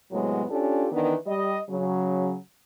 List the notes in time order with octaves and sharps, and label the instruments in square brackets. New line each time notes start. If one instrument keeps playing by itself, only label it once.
[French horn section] A2 C3 F#3 G#3 B3
C#4 D4 F4 G4 A4
D#3 E3 B3 D4 B4
G3 D#5
C#3 F#3